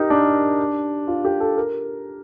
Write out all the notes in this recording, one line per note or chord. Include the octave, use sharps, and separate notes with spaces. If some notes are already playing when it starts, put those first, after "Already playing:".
Already playing: D#4 G4 A#4
D4
F4
G4
A4
A#4